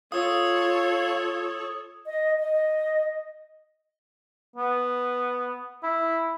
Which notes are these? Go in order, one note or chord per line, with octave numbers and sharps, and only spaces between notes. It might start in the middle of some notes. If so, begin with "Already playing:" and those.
F4 A4 C#5 F5 D#6
D#5
D#5
B3
E4